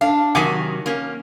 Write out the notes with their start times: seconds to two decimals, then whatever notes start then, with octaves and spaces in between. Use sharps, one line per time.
0.01 D4 F5
0.35 C3 D#3 F#3 F#5 G#5 D6
0.86 A#3 C#4